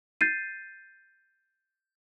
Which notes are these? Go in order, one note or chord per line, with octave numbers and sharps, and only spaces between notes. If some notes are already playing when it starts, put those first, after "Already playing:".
G6 A6 C7 D#7